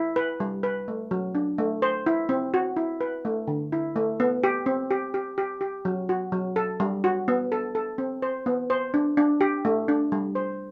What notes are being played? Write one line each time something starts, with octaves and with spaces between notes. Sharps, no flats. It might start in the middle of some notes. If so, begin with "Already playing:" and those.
Already playing: E4
B4
G3
B4
A3
F#3
D4
A3
C5
E4
C4
F#4
E4
B4
A3
D3
E4
A3
B3
G4
C4
G4
G4
G4
G4
F#3
F#4
F#3
A4
G3
F#4
B3
A4
A4
C4
C5
B3
C5
D4
D4
G4
A3
D4
G3
C5